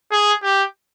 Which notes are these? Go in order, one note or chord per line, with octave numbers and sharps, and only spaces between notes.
G#4
G4